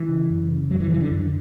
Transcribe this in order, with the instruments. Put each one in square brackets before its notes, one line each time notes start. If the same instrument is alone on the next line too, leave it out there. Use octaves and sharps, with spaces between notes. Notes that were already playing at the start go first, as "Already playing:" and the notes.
Already playing: [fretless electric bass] E3
C#3
F#2
C#3
F#2 F#3
E3
C#3 E3
D3
F#2